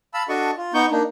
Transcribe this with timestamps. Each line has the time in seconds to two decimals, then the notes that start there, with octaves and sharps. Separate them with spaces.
0.14 F5 A5 B5 E6
0.29 D4 F#4 A4 D#5 A5 C#6
0.57 F4
0.74 B3 D#4 C#6 G6
0.91 A#3 D4 D#4